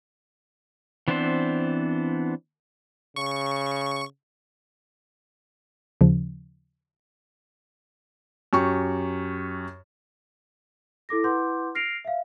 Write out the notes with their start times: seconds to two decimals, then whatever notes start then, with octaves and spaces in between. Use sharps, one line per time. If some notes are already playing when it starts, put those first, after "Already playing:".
1.08 E3 B3 C4 D4 C5
3.16 C#3 C#6
6.01 D#2 C#3 F3
8.53 F#2 G4 C#6
11.09 E4 A4 D6 A#6
11.24 E4 B4 F#5 C6 D6 G6
11.75 F6 A#6 C7 D7 F7
12.05 E5 F5